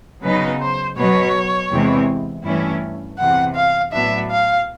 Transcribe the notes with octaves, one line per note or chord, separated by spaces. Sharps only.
C#3 F#3 B3 D#4 B4
C5
B2 F#3 B3 C#5
E2 C3 E3 G#3 C4
G2 E3 A3 C#4 E4
E2 C3 E3 F#5
F5
A2 F#3 B3 D4 E5
F5